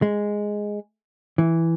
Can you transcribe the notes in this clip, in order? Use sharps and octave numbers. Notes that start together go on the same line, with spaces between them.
G#3
E3